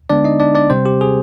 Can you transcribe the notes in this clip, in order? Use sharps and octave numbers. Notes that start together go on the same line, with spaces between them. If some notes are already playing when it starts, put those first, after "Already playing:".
D3 G#3 B3 D4 D5
D#4 D#5
D4 D5
D4 D5
C3 G3 C4 C5
G4
G#4